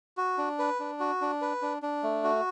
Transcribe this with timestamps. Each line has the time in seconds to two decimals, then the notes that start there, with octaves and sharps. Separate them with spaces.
0.17 F#4
0.38 D4
0.59 B4
0.80 D4
1.00 F#4
1.21 D4
1.41 B4
1.62 D4
1.82 D4
2.03 A3
2.24 F#4